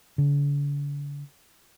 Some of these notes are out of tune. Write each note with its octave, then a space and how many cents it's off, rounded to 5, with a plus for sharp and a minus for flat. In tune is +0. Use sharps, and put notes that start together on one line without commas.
D3 -45